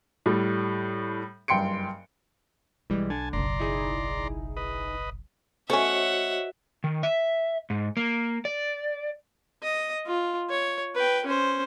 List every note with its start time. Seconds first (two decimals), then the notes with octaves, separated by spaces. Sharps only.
0.26 A2 G3
1.48 F#1 G2 G5 C6 C#7 D7
2.90 B1 E3 G3 G#3
3.10 D3 G#5 A5
3.33 F#1 B1 D5 A#5 C6
3.59 D#4 E4 G#4
4.57 B4 D#5
5.70 A3 C#4 F#4 C5 C#5 D#5 E5 F#5
6.84 D#3
7.03 E5
7.70 G#2
7.97 A#3
8.45 D5
9.63 D#5
10.07 F4
10.50 C#5
10.95 B4 G5
11.26 C#4 C5